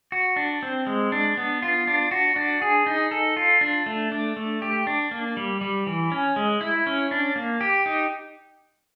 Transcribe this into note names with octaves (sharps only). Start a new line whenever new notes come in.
F#4
D4
C4
G#3
D4
B3
F4
D4
F#4
D4
G#4
D#4
A4
F4
D4
A3
D4
A3
G4
D4
A#3
G3
G3
E3
C#4
G#3
E4
C#4
D4
A#3
G4
D#4